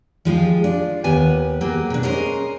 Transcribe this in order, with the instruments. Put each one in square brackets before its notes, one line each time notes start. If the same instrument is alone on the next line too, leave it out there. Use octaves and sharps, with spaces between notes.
[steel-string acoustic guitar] F3 G#3 G4 G#4
D4 F4
D#2 B3 G4 B4 G#5
F#3 A#3 G4 G#4
B2 D4
C#4 G#4 A#4 C5 D#5